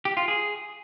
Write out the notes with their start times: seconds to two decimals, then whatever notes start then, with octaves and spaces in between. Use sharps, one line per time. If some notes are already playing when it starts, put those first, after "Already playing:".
0.05 G4
0.17 F4
0.28 G#4